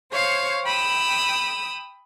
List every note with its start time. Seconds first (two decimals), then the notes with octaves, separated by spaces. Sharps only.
0.12 C5 C#5 F5 C#6
0.65 G5 B5 D#6 E6